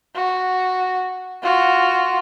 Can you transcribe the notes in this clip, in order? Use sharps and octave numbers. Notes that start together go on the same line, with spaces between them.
F#4
F4 F#4